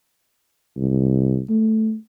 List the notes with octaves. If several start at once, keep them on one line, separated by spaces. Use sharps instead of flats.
C2
A3